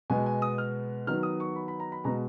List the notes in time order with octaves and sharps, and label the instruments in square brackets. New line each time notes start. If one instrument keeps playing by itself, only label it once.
[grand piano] B2 G#3 B3 G#5
G#5
D#6
F6
D#3 F#3 B3 F6
D#6
C#6
B5
B5
A#5
B5
B2 G#3 B3 A#5